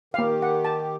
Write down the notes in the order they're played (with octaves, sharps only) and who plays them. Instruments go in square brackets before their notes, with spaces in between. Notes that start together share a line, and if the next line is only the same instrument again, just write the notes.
[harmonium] D#3 G4 [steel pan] A#3 F5
[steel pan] F#5
A5